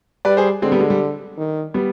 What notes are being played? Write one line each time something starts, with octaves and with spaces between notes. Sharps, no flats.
G3 B4 D5
G#4 C5
D3 G#3 C4
G3 B3
G#3
G3
D#3
G3 B3